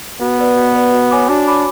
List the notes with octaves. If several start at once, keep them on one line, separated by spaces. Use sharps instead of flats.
B3 F#4
B4 D5
F#4
B4 D5
F#4
C#5 G#5 B5 D6
D4 F#4
C#5 G#5 B5 D6